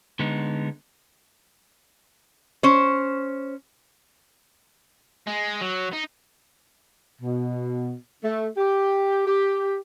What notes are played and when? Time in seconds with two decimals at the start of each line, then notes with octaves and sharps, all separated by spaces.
0.19 D3 G#3 B3 D#4
2.63 C#4 C5
5.27 G#3
5.61 F#3
5.93 D#4
7.22 B2
8.24 A3
8.57 G4
9.27 G4